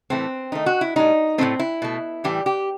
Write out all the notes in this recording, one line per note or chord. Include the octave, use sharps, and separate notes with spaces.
A2 E3 A3 C4
D#3 A3 D#4
F#4
E4
A2 G3 D#4
A2 F#3 A3 C4
E4
B2 A3
A2 E3 G3 G4
G4